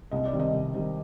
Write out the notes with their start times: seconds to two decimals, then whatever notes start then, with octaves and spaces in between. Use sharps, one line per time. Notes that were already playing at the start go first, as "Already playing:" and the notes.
0.11 C2 D#5
0.25 D5
0.33 C3 D#3 G3
0.40 D#5
0.53 C2
0.74 C3 D#3 G3